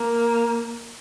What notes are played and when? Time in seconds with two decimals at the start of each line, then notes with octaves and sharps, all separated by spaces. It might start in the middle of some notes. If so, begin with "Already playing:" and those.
Already playing: A#3